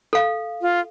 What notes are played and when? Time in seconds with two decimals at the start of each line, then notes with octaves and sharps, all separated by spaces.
0.13 A4 F5
0.62 F4